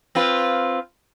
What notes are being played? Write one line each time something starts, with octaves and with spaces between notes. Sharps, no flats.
C4 F4 B4